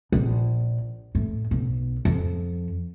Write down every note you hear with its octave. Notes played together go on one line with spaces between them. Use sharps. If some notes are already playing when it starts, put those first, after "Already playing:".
A#1
A2
B1
F2